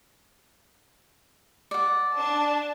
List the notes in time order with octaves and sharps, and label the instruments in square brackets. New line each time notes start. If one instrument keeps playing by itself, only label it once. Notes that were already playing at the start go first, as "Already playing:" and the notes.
[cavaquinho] D5 F#5
[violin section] D4 A5